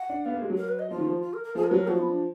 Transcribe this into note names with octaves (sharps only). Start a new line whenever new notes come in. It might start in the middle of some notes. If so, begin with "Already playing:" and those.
Already playing: F#5
D4
B3 F5
A#3
G#3
F#3
A#4
B4
D#5
F3 F4
D#3
F3
F4
A#4
A#4
F3 G#4
A#4
F#3 B4
A#4
F3 F#4
B3
D4